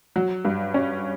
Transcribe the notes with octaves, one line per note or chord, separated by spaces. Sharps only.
F#3
G2
C#4